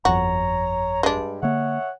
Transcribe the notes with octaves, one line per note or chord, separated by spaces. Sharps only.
G1 F2 F#4 C#5 A#5
G2 G#3 D4
D3 A#3 C#5 E5 F#5